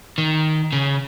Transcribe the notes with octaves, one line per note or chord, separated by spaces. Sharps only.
D#3
C#3